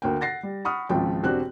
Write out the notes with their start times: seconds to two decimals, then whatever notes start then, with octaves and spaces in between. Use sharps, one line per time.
0.02 D2 A#3 G5
0.21 F#5 A6 A#6 C7
0.43 G3
0.65 F#5 B5 C#6 D#6 F6
0.89 G#1 C#2 F3 G5
1.23 E1 C4 D4 F#4 G4 F#6